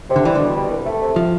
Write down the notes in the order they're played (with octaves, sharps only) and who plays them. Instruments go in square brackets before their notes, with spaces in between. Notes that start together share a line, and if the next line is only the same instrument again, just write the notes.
[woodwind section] C3
[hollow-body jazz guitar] D3
[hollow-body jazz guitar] E3 [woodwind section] G3
[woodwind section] B2 [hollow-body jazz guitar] D3
[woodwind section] G3
C2
A3
C3
[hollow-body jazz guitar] F3